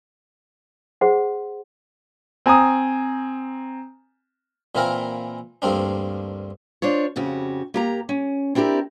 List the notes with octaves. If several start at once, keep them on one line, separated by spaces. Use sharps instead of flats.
G#4 C5 F#5 C6
C4 G#5 A#5 D#6
A#2 E3 A#3 C4 E4 A#4
D2 G2 A#3 C4 D4
D4 F4 C5 C#5
F2 C#3 F#4 G4
A#3 G4 A#5
C#4
C4 D4 E4 G4 A#4